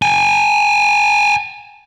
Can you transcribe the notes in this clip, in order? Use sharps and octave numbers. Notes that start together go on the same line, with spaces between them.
G5 G#5